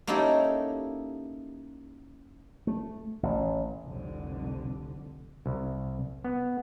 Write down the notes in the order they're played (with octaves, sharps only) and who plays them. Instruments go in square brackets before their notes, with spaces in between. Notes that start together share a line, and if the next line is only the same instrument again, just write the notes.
[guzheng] A#3 C#4 D#4 E4 G4 A4
[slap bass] A3
A1
[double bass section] F1 C2 D3
[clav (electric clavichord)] C2
B3